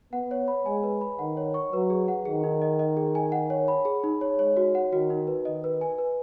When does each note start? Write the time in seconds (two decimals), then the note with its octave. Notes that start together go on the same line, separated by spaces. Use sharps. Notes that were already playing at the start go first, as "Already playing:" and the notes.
0.13 B3 F#5
0.31 C#5
0.48 B5
0.66 G#3 G#5
0.83 B4
1.01 B5
1.19 D#3 F#5
1.37 C#5
1.54 C#6
1.73 F#3 B4
1.90 G#4
2.08 F#5
2.25 D#3 G#4
2.44 D#4
2.62 D#5
2.79 D#5
2.97 G#4
3.15 G#5
3.32 F#5
3.50 C#5
3.68 B5
3.85 G#4
4.04 D#4
4.21 C#5
4.39 G#3 C#5
4.57 F#4
4.75 F#5
4.92 D#3 F#4
5.10 D#4
5.28 B4
5.45 D#3 D#5
5.64 B4
5.81 G#5
5.98 B4